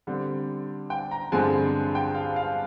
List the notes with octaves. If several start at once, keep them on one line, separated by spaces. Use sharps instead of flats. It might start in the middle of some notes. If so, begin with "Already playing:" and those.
D3 G3 C4
G5
A#5
G2 D3 F3 G#3 C4 G#5
G5
F5
F5